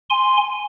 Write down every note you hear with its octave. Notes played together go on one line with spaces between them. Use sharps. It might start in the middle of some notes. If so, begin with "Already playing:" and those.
G#5 C6